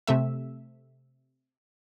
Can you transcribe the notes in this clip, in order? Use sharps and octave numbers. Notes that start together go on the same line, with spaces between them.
C3 A3 E5